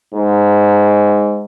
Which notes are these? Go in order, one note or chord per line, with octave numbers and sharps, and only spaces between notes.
G#2